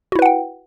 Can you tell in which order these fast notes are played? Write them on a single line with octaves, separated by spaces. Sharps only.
F#4 E4 B4 F#5 G5